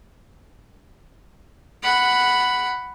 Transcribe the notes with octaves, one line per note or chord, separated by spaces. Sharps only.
F#5 B5